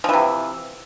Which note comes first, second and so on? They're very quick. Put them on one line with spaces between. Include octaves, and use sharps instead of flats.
F3 E3 C3